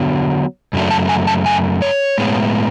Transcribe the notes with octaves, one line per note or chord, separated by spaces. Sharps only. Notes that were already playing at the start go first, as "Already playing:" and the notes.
Already playing: D3 F#3 B3
F#2 C#3 F#3 A3 D4
A5
G#5
A5
G#5
C#5
A2 G#3 B3